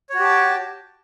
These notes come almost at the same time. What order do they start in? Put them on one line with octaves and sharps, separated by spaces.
C#5 F#4 G4 A5 G5